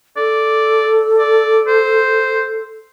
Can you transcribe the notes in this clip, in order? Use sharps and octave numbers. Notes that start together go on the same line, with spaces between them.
A4 D5
D5
C5